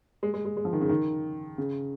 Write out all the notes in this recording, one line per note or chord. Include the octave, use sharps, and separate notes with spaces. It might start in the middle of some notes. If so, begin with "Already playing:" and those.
G#3
G#3
G#3
G#3
F3
D#3
C#3
D#3
C#3